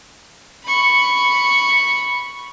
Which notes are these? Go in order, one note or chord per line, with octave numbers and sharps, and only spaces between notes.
B5 C#6